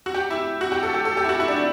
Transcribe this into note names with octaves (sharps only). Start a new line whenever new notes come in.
F#4
G4
E4
F#4
G4
A4
G4
A4
G4
E4
F#4
E4
D4
E4